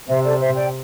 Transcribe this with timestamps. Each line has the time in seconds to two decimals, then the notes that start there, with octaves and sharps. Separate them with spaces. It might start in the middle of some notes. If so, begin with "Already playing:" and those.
0.08 C3 C5 E5
0.24 A4 D5
0.39 C5 E5
0.55 D5 G5